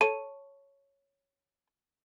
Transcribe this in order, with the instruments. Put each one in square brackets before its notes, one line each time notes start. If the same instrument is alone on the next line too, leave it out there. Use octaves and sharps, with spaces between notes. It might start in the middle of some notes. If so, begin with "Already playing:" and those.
[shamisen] A4 C#5 [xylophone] D#7